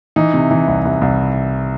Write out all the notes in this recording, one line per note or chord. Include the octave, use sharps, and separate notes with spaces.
E3 D#4
C3
E3
C2
C2
C2